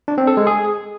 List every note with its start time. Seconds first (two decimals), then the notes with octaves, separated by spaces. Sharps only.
0.08 D4
0.18 C4
0.27 A4
0.37 G#3
0.47 G#4